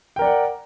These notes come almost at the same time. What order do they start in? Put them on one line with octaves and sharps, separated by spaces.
G5 A#4 D5 F#5